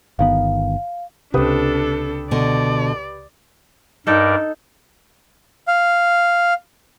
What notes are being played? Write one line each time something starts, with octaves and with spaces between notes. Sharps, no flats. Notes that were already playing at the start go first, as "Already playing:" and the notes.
G1 D#3 B3 F5
C#2 C3 D4 G4 A4 B4 D#6
B2 D3 D5
G2 D#4 A4 A#4 D5
F5